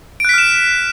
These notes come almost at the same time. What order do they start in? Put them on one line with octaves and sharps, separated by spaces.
D7 F#6 B6 F6 E7